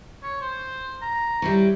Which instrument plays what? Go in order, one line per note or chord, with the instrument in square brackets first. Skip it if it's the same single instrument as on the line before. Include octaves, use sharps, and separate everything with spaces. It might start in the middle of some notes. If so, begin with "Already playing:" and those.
[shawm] C#5
C5
A#5
[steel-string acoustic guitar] G3 E4 C#5